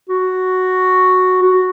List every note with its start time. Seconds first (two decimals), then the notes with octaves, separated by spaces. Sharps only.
0.09 F#4
1.42 F#4